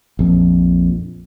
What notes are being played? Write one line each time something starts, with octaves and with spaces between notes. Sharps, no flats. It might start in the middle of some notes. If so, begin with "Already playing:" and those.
A#1 F2